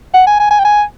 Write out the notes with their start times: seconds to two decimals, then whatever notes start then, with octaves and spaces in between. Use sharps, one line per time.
0.14 F#5
0.27 G#5
0.39 G#5
0.51 G#5
0.59 G5
0.65 G#5